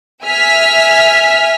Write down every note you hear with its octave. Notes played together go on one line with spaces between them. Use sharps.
E5 G#5 F6 B6